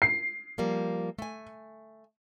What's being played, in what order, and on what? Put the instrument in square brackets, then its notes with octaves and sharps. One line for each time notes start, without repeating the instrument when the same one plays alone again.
[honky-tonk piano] C7
[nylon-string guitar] F3 G3 A#3
A3 G#5